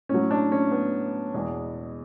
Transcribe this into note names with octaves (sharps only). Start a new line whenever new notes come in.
A2 F#3 C#4
D4
C#4
B3
E2 B2 G#3